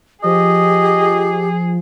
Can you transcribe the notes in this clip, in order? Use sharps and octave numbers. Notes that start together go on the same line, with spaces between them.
F3 G4 G#4 D#5